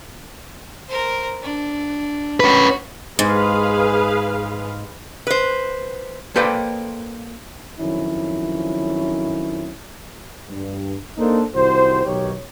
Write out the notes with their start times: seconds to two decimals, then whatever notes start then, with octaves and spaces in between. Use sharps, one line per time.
0.88 A#4 C5
1.43 D4
2.40 C#4 F#4 B4
3.19 G#2 G#4 B4 F5
5.27 B4 C5
6.36 A#3 A4 B4 C5 D5 G5
7.79 F2 D#3 F3 F#3 C#4 E4
10.48 G2
11.18 A#3 D4 D#4 A4 C5
11.55 C2 D#3 F#4 C5
12.05 B1 D#3 G4 C#5